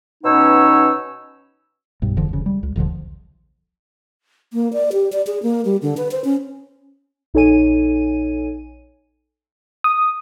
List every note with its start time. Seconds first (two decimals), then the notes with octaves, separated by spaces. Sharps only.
0.24 B2 B3 C#4 D#4 C#5 E6
2.02 B1 G2
2.17 F1 E2 D3 F3
2.29 E1 C#3
2.46 G3
2.63 C#2
2.76 D#1 A#1 D3 F3
4.53 A#3
4.73 D5
4.93 G4
5.12 D5
5.27 G#4
5.43 A#3
5.65 G3
5.82 D3
5.97 B4
6.11 C5
6.24 C#4
7.34 A#1 D#4 A4 C#5 G#5 D#7
9.84 D#6